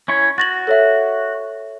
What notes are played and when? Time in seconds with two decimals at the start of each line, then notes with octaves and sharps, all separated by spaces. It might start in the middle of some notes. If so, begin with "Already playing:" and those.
0.08 C#4 E4 C#5
0.38 F#4 A6 A#6 F#7
0.67 A4 C#5 E5